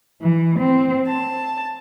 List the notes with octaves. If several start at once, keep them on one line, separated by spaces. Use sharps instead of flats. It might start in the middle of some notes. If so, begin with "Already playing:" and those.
E3
C4
A5